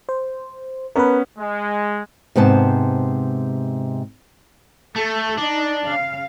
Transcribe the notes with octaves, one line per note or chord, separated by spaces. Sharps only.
C5
B3 C#4 A#4 B4
G#3
G#2 C3 B3 A5
A3 A4
D4 D#4
C#3 F5